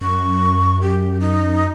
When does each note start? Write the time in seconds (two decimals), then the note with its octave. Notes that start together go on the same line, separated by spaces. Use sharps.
0.01 F#2 C#6
0.82 G4
1.20 D#4